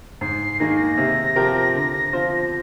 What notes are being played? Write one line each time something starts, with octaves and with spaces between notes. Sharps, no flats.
G#2 C7
D#3 A#3 D#4 G#4 A#6
C7
A#6
C3
F3 C4 G4 A#4
D3
F3 C4 F4 C5